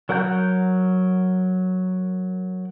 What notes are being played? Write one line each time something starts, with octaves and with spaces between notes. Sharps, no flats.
F#3 A#4 F#5 A#5 G6